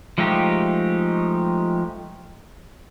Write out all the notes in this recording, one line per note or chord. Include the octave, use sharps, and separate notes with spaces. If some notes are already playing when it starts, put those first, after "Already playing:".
F3 G#3 A3 D#4 G4